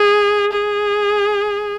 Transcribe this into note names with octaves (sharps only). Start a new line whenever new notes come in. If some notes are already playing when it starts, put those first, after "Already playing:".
Already playing: G#4
G#4